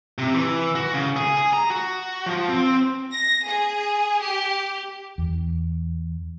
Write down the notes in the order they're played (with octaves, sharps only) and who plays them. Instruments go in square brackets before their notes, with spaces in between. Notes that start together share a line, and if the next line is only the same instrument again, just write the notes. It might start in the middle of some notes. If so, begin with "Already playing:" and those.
[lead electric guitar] C3
E3
F#4
C#3
G#4
G#4
A#5
F#4
F3
C4
[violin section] A#6
G#4
G4
[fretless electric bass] E2